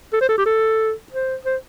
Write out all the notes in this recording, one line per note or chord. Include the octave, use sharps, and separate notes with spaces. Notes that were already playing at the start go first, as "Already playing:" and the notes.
A4
C5
A4
G4
A4
C5
C5